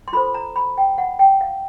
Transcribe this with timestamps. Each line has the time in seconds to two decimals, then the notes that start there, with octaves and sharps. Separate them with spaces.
0.08 C6
0.13 F4 A4 C5 B5
0.34 A#5
0.56 B5
0.78 G5
0.98 F#5
1.19 G5
1.41 F5